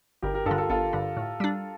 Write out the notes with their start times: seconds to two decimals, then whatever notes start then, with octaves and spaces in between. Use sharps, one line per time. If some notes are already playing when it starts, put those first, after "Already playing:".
0.22 G1 G4 A#4
0.34 G4 A#4
0.46 G2 F4 A4
0.51 D3
0.58 F4 A4
0.70 G1 F4 A4
0.93 G2 D3
1.17 A2
1.40 G3 D4